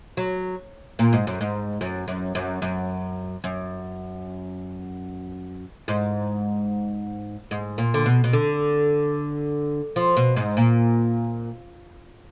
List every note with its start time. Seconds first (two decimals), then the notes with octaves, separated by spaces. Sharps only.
0.17 F#3
0.99 A#2
1.13 G#2
1.27 F#2
1.41 G#2
1.81 F#2
2.08 F#2
2.35 F#2
2.62 F#2
3.44 F#2
5.88 G#2
7.51 G#2
7.78 A#2
7.94 D3
8.06 B2
8.24 B2
8.33 D3
9.96 F3
10.17 B2
10.36 G#2
10.57 A#2